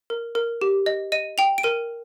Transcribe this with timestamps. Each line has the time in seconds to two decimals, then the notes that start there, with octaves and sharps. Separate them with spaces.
0.10 A#4
0.35 A#4
0.62 G4
0.86 D#5
1.12 D#5 D#7
1.38 G5 F7
1.58 D7
1.63 A#4 D#7